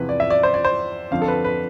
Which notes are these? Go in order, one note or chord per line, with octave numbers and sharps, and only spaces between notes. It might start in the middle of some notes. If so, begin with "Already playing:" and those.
Already playing: E2 C3 F3 C4 E4 B4
D5
E5
D5
C5
D5
C5
F2 D3 F3 C4 F5
A4
B4
B4